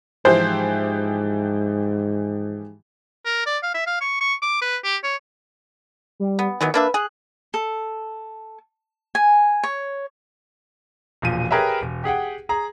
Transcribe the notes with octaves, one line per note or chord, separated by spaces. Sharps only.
G#2 E3 F3 G4 C5
A#4
D5
F5
E5
F5
C#6
C#6
D6
B4
G4
C#5
G3
B3
D#3 E3 F#3 B3
A#3 D4 B4 E5
G#4 F#6
A4
G#5
C#5
E1 A#2 F3 D#7
G4 G#4 A#4 B4 C#5 E5
E1
G4 G#4 F#5 G5
G#4 A#5